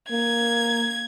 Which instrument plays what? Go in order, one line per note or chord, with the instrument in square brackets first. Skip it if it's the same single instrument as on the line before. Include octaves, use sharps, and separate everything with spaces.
[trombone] A#3 [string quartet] G#6